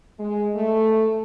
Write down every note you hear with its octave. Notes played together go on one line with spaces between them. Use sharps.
G#3
A3